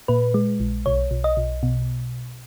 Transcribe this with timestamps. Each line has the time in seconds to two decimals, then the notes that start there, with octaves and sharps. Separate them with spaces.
0.08 A#2 B4
0.34 G#3
0.60 A#1
0.86 B1 C#5
1.11 B1
1.24 D#5
1.37 B1
1.63 B2